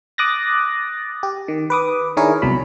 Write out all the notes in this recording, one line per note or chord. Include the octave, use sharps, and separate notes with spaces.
D6 D#6 F#6 A6 A#6
G4
D#3
B4 D6 D#6
D#3 D4 E4 G#4 A#4 C#5
C2 B2 F#3 B5